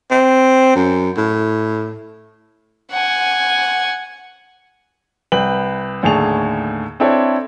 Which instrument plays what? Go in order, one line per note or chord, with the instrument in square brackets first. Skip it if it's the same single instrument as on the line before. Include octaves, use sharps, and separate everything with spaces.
[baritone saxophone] C4
F#2
A2
[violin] F#5 G#5
[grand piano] C2 B4 G5 F#7
D#2 A2 D3 G#4 A5 F7
C4 D4 E4 A4 C#5